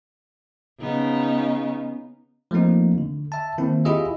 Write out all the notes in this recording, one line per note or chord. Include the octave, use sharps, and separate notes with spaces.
C#3 B3 D#4
F3 A3 A#3 C4 D#4
D3
E5 A5
D#3 A#3 C4 E4
E4 F4 G4 G#4 D#5 E5